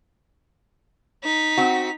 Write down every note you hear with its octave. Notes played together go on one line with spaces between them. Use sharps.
D#4 B6
C4 F#4